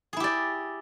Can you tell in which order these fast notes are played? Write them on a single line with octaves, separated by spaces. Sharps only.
G#4 E4 G4 D5